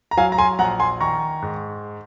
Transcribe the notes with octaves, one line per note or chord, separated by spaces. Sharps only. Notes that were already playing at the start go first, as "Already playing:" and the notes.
A#5
F#3 F5 G#5
A#5
G#5 C6
A#1 F#5 A#5
G#5 C6
D#3 A#5 C#6
G#2